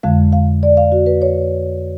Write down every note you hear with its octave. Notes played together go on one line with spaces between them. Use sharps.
F2 D3 G#3 F5
F5
D5
F5
F#4
B4
C#5